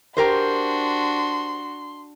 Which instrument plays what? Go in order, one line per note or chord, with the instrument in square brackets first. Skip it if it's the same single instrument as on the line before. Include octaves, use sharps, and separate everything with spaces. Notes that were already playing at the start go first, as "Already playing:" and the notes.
[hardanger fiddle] D4 F#4 [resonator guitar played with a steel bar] G4 A#4 C5 [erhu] C6